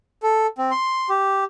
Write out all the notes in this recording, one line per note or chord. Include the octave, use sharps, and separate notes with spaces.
A4
C4
C6
G4